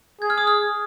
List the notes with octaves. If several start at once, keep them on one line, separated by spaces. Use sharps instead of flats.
G#4 G#6
F6
D#6
F6